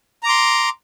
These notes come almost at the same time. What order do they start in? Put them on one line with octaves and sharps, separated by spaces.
A#5 D6 C6